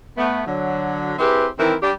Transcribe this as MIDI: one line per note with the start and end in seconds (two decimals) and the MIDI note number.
0.18 0.42 57
0.18 0.42 59
0.47 1.13 50
0.47 1.13 54
1.18 1.46 60
1.18 1.46 64
1.18 1.46 67
1.18 1.46 68
1.18 1.46 71
1.59 1.75 51
1.59 1.75 52
1.59 1.75 60
1.59 1.75 64
1.59 1.75 70
1.83 1.91 55
1.83 1.91 62
1.83 1.91 67